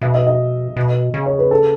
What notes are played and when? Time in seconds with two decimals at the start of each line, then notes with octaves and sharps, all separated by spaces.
0.01 B2 E5
0.15 D#5
0.27 D#5
0.76 B2
1.14 C#3
1.26 C#5
1.39 B4
1.51 A4